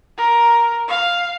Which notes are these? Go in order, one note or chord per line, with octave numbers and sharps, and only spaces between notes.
A#4
F5